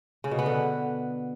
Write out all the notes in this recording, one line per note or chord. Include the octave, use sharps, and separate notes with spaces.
C#3
B2
B3
D3